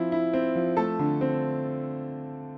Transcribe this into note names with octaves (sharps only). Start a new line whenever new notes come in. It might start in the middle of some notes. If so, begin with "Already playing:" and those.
Already playing: F3 C4 E4
E4
C4
F3
A3 A4 A5
D3
C4